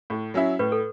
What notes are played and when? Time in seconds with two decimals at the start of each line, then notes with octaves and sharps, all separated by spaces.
0.10 A2
0.34 F#3 C#4 E4
0.59 A2 B4
0.72 A4